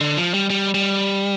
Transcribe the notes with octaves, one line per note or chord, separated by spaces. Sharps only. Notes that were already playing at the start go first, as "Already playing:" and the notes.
D3
F3
G3
G3
G3